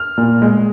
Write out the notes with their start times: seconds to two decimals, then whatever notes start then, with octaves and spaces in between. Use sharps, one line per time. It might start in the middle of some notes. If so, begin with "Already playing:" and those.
Already playing: F6
0.18 A#2
0.42 G#3